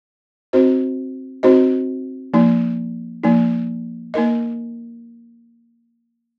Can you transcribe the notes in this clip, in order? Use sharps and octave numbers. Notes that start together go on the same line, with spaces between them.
C4 D#4 F#4 C5 D#5
C4 D#4 F#4 C5 D#5
F3 A#3 D#4
F3 A#3 D#4
A#3 D#4 A#4 D#5